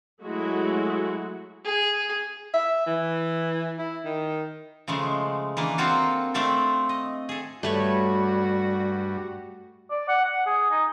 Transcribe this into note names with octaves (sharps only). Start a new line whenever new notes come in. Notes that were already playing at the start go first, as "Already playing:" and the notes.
F#3 G#3 A3 E4 F#4
G#4
E5
E3
E4
D#3
C#3 F3 G#3 A3
E3 A#3 D4
A#3 C4 F4 F#4 A4
A3 C4 D4 F4 A4
D#5
G#4 A4
G2 G3 A3 F#4 B4 C#5
D5
F#5
F#5
G#4
D#4